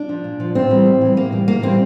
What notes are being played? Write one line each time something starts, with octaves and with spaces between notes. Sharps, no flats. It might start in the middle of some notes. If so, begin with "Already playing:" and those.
Already playing: D4
F3
A#2
F3
A2 C4
E3 G3
A2
E3 G3
A2 A#3
E3 G3
A2 A#3
E3 G3 C4